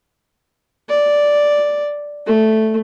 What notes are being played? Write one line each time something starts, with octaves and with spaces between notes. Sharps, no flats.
D5
A3